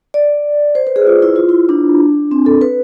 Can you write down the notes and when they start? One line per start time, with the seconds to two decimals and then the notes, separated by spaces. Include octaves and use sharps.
0.14 D5
0.75 C5
0.87 B4
0.96 G#4
1.07 F4
1.22 E4
1.36 F4
1.49 E4
1.69 D4
2.31 C4
2.46 A4
2.61 B4